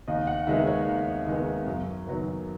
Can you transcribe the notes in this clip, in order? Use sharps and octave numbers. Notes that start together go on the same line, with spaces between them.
D#2 D#5
F#5
D#3 G#3 B3 E5
C#5
D#2
D#3 G#3 B3
F#2
D#3 F#3 B3